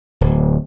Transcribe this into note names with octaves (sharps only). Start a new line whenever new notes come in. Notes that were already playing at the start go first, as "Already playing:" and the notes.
D1